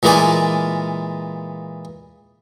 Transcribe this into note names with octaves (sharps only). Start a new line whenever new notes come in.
A#2 E3 G#3 A#3 D5 G#5